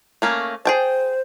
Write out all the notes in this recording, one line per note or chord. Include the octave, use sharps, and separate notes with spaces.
A3 A#3 C#4
G#4 C5 G5 A5